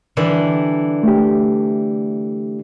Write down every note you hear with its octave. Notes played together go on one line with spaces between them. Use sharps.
D3 E3 G3
A3 G4